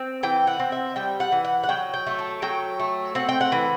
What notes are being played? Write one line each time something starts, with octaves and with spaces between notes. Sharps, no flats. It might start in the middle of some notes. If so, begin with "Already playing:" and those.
Already playing: C4
E3 G5
F#5
C4
E5
G3 G5
F#5
E3
F#5
F#5
F#3 G5
G5
A3
A5
F#3 G5
A3
C4 F#5
G5
F#5
E3